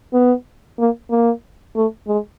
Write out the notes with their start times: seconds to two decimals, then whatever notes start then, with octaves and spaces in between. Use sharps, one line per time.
0.13 B3
0.79 A#3
1.10 A#3
1.76 A3
2.08 G#3